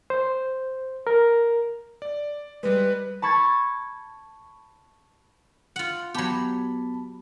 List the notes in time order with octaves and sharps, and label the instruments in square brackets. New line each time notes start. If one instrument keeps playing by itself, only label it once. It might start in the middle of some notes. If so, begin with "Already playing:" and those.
[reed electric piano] C5
A#4
[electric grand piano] D5
[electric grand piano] G3 G#3 [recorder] B4
[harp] A5 B5 C#6 G#6 A6
[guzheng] F4 F#5
[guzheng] F#3 G4 [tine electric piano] B3 A5 B5